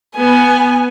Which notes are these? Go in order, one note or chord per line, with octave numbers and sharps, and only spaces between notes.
B3 G#5